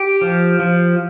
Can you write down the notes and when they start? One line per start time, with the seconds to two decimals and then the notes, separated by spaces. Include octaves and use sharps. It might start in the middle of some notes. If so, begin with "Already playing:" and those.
Already playing: G4
0.22 F3
0.60 F3